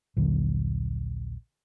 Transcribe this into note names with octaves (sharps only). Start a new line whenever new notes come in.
A#1 D#2 D3 F#3